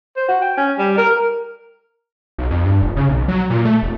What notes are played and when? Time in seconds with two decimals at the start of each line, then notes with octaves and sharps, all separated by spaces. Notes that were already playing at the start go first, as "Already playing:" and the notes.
0.17 C5
0.28 F#4
0.42 G5
0.57 C#4
0.78 G3
0.98 A#4
1.10 A#4
2.38 B1
2.50 F2
2.65 G2
2.82 F1
2.96 C#3
3.09 B1
3.28 F#3
3.50 A#2
3.65 A3
3.82 F1